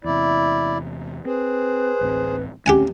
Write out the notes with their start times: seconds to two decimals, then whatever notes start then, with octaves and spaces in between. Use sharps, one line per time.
0.04 E2 C3 E4 D5
1.25 C4 G#4 B4 C5
2.01 D1 A1 C4
2.66 A1 D2 C4 C#4 G4 F#5 G#5